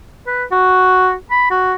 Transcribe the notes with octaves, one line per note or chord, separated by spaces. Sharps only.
B4
F#4
B5
F#4